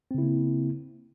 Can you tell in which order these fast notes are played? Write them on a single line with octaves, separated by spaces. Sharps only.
C4 C#3 E4 A#3